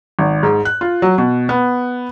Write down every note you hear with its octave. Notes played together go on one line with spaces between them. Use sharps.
G#1
G#2
F#6
F4
F#3
B2
B3